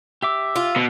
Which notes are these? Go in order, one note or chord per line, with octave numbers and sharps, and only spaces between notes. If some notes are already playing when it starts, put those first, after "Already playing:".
G4 E5 D6 E6
F4
B2